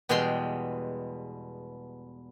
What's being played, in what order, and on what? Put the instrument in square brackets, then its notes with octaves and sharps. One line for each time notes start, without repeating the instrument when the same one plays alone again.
[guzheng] E2 B2 G3 G#3 G5 C6